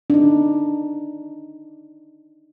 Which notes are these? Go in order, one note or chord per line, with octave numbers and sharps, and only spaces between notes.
D4 D#4